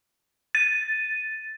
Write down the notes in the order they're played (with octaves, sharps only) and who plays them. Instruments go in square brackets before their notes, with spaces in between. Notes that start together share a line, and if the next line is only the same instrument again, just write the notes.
[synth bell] A6 D#7